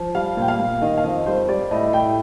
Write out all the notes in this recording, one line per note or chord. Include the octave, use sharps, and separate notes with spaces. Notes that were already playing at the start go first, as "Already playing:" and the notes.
Already playing: F3
G3 F5
A#2 G5
F5
A#2
D#3 D#5
F5
F2 D#5
G3 C5
G3 D5
A2 D#5
A2 G5